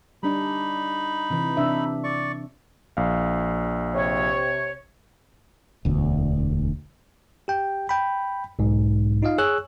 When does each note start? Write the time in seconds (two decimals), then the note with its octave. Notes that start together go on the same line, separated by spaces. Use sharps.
0.23 G3 D4 D#4 B5
1.30 C3 E3
1.57 C3 D4 E5
2.04 D5 C#6
2.97 A#1 F5
3.94 C3 C#5
5.85 E1 D2
7.48 G4 G5
7.89 G5 B5
8.59 B1 G#2
9.22 D#4 F4 D#5 F5
9.38 G#4 C#5 E6 F#6